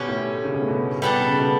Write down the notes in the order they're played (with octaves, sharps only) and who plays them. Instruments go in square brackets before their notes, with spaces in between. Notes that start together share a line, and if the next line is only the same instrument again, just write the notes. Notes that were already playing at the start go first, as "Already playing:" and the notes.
Already playing: [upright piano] B2 [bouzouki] D3 G3 C#4
[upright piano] A2
C#3
B2
A2
B2
[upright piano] B2 [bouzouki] G3 B3 D4 A4
[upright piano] C#3
C#3
B2